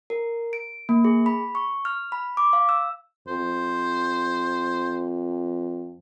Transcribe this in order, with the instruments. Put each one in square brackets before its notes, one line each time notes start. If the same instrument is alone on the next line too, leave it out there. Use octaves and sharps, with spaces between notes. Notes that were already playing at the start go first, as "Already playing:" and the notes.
[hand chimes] A#4
D7
A#3
G#4
B5
C#6
F6
B5
D6
F5
E6
[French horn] F2 [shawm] C5